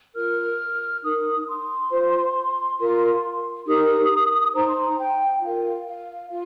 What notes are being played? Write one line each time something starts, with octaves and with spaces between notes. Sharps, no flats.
F4 A#4 F6
D#4 A#4 D#6
C6
F4 C5
F4 A#4
D#4 G4 A#4 D#6
D#4 C5 A#5
C6
A#5
G5
F4 A#4 F5
F5
F4 F5